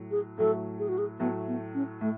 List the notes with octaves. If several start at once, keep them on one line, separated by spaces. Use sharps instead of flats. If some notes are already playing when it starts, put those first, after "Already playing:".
Already playing: A2 F#3 A3
G#4
A2 F#3 A3 A4
G#4
F#4
G#4
A2 F#3 A3 B3
B3
C#4
A2 A3